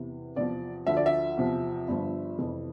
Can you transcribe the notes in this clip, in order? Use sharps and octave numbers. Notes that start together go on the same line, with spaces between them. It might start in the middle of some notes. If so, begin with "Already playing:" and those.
Already playing: E2 C3 E3
E2 C3 F3 D5
D2 D3 F3 E5
D5
E5
E2 C3 F3
G1 G2 F3
F1 F2 E3